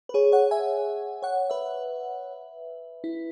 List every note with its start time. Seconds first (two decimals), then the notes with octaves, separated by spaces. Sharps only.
0.09 B4
0.14 G#4 C#5
0.32 C#5 F#5
0.51 E5 G#5
1.22 C#5 F#5
1.50 B4 E5
3.04 E4